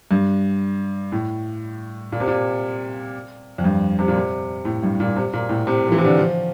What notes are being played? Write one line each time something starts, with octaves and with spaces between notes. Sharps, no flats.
G2
A2
A#2
C3
A#2
F2
G2
C3
A#2
C3
A2
G2
A#2
C3
A#2
A2
C3
F3
E3
C3
D3
F3